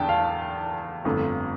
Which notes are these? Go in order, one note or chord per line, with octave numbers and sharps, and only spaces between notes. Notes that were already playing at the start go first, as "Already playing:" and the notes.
Already playing: E2 D3 G5 A5
F5
G1 F2 D3 A3